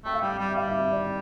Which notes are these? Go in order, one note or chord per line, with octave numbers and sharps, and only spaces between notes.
A3 G5
F5
G3 G5
G3
E5
G3 F5
E5
E5
D5